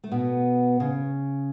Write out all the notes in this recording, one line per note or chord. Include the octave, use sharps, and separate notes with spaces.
A3
B2 B3
C#3